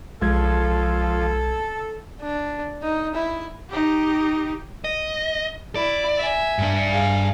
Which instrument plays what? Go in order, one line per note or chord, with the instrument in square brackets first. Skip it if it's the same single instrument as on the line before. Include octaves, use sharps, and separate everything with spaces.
[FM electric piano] B1 G#3 G#6 [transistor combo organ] F3 [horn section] A4
[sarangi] D4
D#4
E4
[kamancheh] D#4 G4
[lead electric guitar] D#5
[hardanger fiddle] E4 [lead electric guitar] D5
[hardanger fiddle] E5 G#5
[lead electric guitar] G2 D4
[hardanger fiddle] G#4 F5